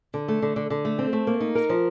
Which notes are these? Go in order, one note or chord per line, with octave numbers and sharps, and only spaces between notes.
D3
A3
D3
D3
D3
A3
C4
A3
A#3
D#4
A#4
F3